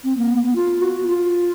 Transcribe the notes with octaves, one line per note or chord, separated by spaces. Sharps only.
C4
A#3
B3
B3
F4
F#4
F4